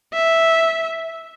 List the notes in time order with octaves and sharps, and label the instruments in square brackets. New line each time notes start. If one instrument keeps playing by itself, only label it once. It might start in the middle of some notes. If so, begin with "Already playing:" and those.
[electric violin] E5